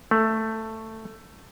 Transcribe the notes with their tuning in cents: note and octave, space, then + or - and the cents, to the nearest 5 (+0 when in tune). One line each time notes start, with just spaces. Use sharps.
A3 +10